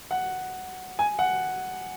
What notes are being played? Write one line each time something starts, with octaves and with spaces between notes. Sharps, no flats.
F#5
G#5
F#5